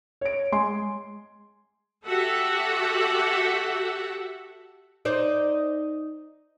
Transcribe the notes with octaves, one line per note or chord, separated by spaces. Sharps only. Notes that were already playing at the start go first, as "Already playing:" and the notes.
C#5 D7
G#3 G#5 C6
F#4 G4 A4 E5 F#5
D#4 C5 D5